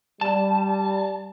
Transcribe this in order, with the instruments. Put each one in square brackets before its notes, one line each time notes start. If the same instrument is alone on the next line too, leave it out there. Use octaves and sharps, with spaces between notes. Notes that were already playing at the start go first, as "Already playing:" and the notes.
[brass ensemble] G3 [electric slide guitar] A5